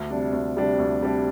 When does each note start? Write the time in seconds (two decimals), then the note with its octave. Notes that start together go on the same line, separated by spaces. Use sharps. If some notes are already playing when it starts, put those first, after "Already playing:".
Already playing: D2
0.10 C3 G3 D4
0.33 D2
0.56 C3 G3 D4
0.79 D2
1.01 C3 G3 D4